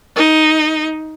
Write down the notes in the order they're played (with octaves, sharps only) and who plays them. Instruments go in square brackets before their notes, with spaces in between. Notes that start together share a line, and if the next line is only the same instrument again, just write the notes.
[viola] D#4